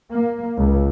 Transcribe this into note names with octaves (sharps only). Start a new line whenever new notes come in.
A#3
C#2